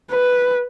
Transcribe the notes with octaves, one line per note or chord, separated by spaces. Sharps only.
B4